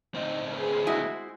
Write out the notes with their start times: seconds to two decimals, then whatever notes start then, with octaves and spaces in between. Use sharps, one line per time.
0.15 D2 C4 D#4 D#5
0.50 G#4 B4
0.87 G#3 E4 F#4 C5